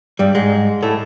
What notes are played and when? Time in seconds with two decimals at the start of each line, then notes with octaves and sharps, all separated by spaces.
0.19 G2 G3
0.35 G#2 G#3
0.82 A2 A3